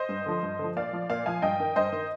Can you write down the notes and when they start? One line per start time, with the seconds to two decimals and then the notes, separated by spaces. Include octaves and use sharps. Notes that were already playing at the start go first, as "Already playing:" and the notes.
Already playing: C5 D#5
0.09 G2
0.26 D3 F3
0.43 G2
0.59 D3 F3
0.76 A#2 D5 F5
0.93 F3
1.10 A#2 D5 F5
1.26 F3 F5 G#5
1.42 G2 D#5 G5
1.60 D#3
1.76 G2 C5 D#5
1.92 D#3